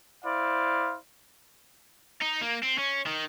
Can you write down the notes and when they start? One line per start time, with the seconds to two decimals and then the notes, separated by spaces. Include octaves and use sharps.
0.25 E4 C5 D5 F5
2.21 D#4
2.41 A#3
2.63 C4
2.78 C#4
3.07 D#3